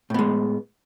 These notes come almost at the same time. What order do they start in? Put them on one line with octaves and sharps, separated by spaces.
A2 B3 G#3